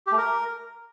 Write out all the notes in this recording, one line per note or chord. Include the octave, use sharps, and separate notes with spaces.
G4
A3
A#4